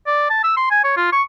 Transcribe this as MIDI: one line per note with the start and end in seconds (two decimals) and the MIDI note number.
0.07 0.26 74
0.30 0.41 81
0.44 0.52 88
0.57 0.68 84
0.71 0.84 80
0.84 0.93 73
0.97 1.09 65
1.12 1.22 85